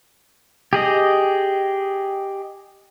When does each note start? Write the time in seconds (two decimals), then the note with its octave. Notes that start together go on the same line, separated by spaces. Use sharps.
0.73 G4 G#4 D#5